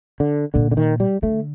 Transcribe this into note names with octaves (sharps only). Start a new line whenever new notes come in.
D3
A#2 D3
D3
D#3
G3
D3 A3